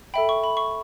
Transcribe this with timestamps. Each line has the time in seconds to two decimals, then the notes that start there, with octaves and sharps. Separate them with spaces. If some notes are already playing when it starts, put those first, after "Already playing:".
0.14 A4 E5 G5 B5
0.29 C#6
0.44 B5
0.57 C#6